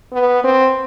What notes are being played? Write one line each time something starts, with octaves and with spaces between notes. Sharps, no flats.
B3
C4